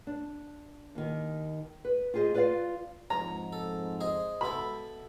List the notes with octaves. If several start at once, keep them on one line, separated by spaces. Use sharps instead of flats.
D4
D#2 D#3
B4
F4 G4 G#4 C5 D#5
F4 B4 D5 D#5 F5
F2 G#2 C#5 A#5
A4
G#4 C5 D#5
B2 E4 A4 B5